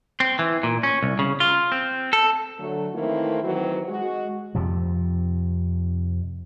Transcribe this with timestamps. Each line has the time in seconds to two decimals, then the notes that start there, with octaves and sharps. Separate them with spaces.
0.20 C4
0.39 E3
0.63 A#2
0.83 C#4
1.03 C2
1.19 C#3
1.40 F4
1.72 C4
2.13 A4
2.59 D3 F#3 A3
2.95 D#3 E3 A3 A#3 C4 E4
3.43 D#3 E3 F#3 C4 F#4
3.89 G#3 F#4
4.55 F2 C3 F3